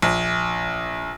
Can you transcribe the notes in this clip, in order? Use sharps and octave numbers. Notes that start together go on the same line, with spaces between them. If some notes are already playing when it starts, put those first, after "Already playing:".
A#1